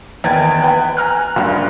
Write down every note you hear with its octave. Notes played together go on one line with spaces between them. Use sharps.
E2 D#3 B4 G#6 A6
B4 G5
G#5 A#5 F6 F#6
F#1 G2